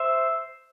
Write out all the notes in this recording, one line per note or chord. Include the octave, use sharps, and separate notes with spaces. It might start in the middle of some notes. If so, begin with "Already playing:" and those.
Already playing: C5 E5